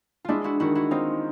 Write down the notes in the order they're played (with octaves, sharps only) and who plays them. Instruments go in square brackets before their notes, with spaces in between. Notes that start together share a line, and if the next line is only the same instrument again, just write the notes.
[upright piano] G#3 [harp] D4 E4 F4
[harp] E4 F#4
[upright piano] D#3 [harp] E4 F#4
[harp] E4 F#4
[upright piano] C4 [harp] D#4 F4